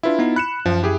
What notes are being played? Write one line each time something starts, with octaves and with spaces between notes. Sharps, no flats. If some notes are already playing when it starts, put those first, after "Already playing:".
D4 E4 F4 B4 E5
B3 D#4
B5 F#6 C#7 E7
F#2 F3
E4 G4 G#4